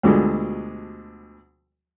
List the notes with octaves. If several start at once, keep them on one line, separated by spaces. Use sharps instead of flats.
D2 B2 D3 F3 G3 G#3